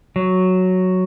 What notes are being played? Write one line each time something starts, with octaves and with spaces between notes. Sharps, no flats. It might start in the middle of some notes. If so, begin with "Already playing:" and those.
F#3